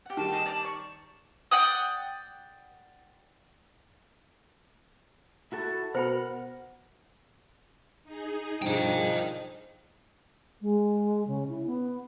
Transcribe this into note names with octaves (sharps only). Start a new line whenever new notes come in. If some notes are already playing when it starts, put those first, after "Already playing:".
G4 F#5
D#3 G3 A5
D#4 G#4 D#6
D5 A#5 D6
D5 C#6
D5 F#5 G5 D#6
E4 F#4 A4
B2 A#4 C5 F#5 B5 F6
D#4 G#4
G2 B2 F3 G3 D4 D#5 G5
G#3
C#3
E4
B3